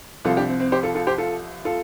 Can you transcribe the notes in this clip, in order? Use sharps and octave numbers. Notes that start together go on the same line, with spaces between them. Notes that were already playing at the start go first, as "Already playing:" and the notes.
C2 C3 F3 F4 A4
D4 G4
C4
C4
G4 C5
F4 A4
F4 A4
G4 C5
F4 A4
F4 A4